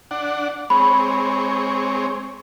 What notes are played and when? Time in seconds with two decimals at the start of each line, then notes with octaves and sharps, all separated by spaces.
0.11 D4 F#5
0.70 G#3 C4 C#5 B5